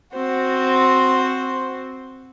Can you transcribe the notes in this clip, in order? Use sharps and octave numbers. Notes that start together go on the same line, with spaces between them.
C4 F#4 C5